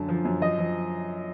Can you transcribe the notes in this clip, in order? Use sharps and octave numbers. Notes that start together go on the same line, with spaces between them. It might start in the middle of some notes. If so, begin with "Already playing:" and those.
Already playing: F#2 D3 A5
F3
F#2
F3 D#5
F3